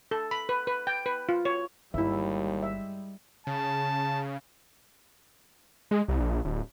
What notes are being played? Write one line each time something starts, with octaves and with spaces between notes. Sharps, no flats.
A4
B5
B4
B4
G5
B4
F4
C#5
G1 D#2 G3 G#3 E4 E5
E5
C#3 A5
G#3
C2
A#1
D1